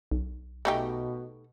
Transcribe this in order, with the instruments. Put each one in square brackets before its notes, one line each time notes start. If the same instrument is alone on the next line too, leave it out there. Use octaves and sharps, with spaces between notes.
[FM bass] B1
[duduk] B2 [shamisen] A3 D#4 G4